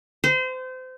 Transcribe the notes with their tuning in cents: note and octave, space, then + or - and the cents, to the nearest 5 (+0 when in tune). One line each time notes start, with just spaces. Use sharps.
C5 -30